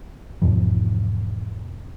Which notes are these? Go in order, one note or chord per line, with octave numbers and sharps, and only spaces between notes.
E2 G#2 B2 F3